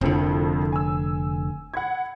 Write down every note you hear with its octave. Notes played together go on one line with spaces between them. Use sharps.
F1 C2 F2 D3 C4
G#5 E6
F#5 B5 G#6